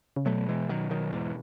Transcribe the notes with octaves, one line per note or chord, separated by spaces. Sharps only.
C#3
B2 F#3 A3
E3 G#3
D#3 F#3
D#3 F#3
E2 G#2